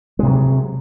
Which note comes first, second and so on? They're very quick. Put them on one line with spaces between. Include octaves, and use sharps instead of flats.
G#3 C3 F#3